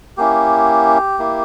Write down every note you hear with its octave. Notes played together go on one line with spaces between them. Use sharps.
A#3 C#4 E4 G4
A#3 E4